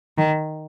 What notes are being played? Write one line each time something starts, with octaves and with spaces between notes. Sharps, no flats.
D#3